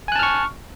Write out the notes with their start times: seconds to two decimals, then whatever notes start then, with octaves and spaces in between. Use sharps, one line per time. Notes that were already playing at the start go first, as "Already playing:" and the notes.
0.08 G#5
0.12 F#6
0.16 A5
0.19 F6
0.23 C#6